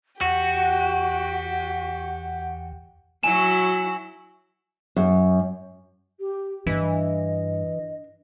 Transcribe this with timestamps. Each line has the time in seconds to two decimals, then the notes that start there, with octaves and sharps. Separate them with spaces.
0.21 E2 F#4 G4 F#5
3.23 F#3 E4 F#4 G#5 E7
4.96 F#2
6.19 G4
6.67 G2 E3 D4 D#5